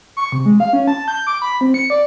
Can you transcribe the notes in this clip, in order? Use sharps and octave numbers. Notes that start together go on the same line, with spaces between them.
C#6
C3
G#3
F5
C#4
A5
G6
D6
B5
C4
C#7
D5